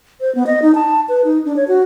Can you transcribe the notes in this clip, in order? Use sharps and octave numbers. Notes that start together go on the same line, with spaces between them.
C5
B3
D#5
D#4
A5
B4
D#4
D4
C#5
F#4